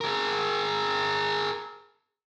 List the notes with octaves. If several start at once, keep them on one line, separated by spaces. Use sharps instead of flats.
G#4 A#4